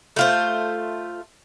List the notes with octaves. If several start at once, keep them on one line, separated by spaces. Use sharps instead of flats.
A3 F4 C5